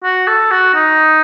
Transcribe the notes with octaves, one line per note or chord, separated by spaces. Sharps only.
F#4
A4
F#4
D#4